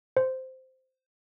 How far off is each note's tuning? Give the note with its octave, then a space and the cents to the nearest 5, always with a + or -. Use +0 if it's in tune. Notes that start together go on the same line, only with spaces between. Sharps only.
C5 -10